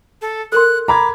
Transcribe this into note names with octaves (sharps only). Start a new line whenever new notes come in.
A4
A4 A#4 C6 F#6
A#5 B5 D6 G#6